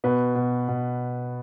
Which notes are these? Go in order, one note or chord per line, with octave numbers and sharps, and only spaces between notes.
B2 B4
B2
B2